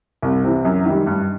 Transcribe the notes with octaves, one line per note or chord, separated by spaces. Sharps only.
C2
C3 E3
F#2
D#3 G3
G2